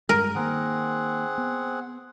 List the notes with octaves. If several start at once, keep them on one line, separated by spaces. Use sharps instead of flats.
G2 G3 G#3 A#4
D#3 A#3 C4 G#4 F#5
B3